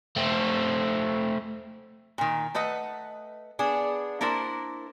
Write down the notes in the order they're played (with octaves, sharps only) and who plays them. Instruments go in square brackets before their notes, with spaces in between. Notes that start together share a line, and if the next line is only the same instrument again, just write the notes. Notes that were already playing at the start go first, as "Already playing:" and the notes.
[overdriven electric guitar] A3 C4
[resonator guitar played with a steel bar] A#2 D#3
A3 B4 D#5 F#5
B3 D4 G#4
A#3 D4 E4 A#4 C5